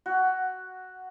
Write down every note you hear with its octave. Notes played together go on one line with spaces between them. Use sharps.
F#4